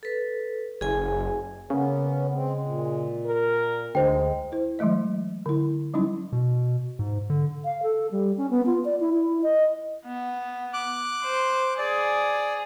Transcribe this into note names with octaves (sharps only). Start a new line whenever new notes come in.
A4 B4
F#1 G#4 G#5
C#3 A#3 B3 C#4
G#3 C4
A#2
A#4
D2 G#3 D#4 C5 G5
E4 C5
E3 F#3 G#3 A3 D#5
D3 E4
F#3 G3 C#4 D#4 E4
B2
G#2
D3
F5
A4
G3
C#4
B3
F4
D5
E4
E4
D#5
B3
D6 F#6
C5
G#4 D5